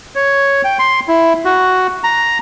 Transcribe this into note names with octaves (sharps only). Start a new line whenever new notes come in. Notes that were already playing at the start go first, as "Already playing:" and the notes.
C#5
G5
C6
E4
F#4
A#5